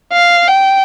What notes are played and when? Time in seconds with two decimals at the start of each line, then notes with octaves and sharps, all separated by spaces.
0.13 F5
0.48 G5